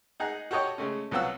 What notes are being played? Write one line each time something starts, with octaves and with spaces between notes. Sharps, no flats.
D#4 G#4 F#5 A#5
F#4 G4 A4 C#5 D#5 G5
C#3 G#3 A3 C#4
C2 F#3 B3 F4 F#5 E6